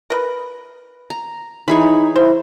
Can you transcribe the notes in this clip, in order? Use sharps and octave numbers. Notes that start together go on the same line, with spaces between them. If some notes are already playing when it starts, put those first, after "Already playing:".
A#4 B4
A#5
E3 D#4 G#4 C#5 B5
E4 C5